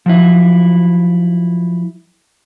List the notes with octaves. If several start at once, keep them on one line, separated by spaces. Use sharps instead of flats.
F3 F#3 E4